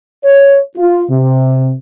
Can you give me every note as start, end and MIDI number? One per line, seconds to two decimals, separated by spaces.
0.24 0.58 73
0.76 1.03 65
1.09 1.72 48